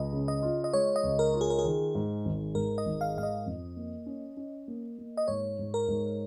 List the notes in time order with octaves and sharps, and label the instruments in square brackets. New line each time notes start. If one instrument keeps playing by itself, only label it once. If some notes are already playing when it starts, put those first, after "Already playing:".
Already playing: [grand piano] C#2 [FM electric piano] D#5
[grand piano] C#3
[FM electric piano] D#5
[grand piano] F4
[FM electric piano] D#5
[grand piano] G#3 [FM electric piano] C#5
[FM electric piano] D#5
[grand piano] C#2
[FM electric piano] A#4
[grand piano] F4
[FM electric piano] G#4
A#4
G#4
[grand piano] D#3
G#2
G#1
[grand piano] G#2 [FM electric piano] A#4
[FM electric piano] D#5
[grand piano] G#1
[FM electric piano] F5
[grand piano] G#2 [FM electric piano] F5
[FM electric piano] D#5
[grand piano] F2
A#3
C#4
C#4
A#3
A#3
[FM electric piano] D#5
[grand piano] G#2 [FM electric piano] C#5
[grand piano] G#2
[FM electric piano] A#4
[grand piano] G#2